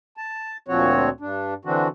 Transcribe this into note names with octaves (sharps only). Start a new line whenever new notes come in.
A5
D2 A#2 F3 C4 F#4 C#5
G2 D4
D3 E3 C4 D4 F#4